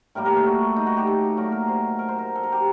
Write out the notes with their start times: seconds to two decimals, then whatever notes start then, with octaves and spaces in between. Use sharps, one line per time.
0.15 A2 G3 A#3 A#4
0.26 A#4
0.36 A4
0.47 F#4
0.76 D#4
0.87 F#4
0.97 G4
1.07 A4
1.37 A#2 F#3 A3 A#4
1.52 A#4
1.68 C5
1.99 A#4
2.08 C5
2.18 A#4
2.36 A4
2.43 A#4
2.52 G4